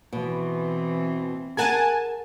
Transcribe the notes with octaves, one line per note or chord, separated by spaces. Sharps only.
B2 E3 C4
G#4 A#4 F#5 G#5 A5